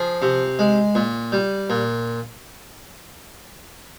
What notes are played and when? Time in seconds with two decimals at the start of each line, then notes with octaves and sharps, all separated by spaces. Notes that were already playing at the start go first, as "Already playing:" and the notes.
Already playing: F3 G#4
0.22 C3
0.59 G#3
0.95 A#2
1.32 G3
1.70 A#2